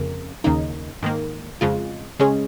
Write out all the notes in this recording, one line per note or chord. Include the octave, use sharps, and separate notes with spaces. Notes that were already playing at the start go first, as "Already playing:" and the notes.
Already playing: F2 C#3 A#3
D#2 C#3 A#3 D#4
G#2 D#3 A#3
F2 C#3 G#3 F4
C#3 G#3 C#4 G#4